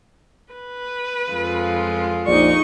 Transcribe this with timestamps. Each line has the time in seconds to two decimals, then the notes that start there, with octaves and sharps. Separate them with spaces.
0.53 B4
1.31 F2 G#3 F4
2.27 A#1 D#4 D5 C#6